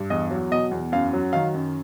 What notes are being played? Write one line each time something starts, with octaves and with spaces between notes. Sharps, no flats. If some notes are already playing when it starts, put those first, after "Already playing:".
Already playing: G2
E2 D#5
F#3
B2 D#5
E2
F#2 F5
F#3
D#3 F5
F#2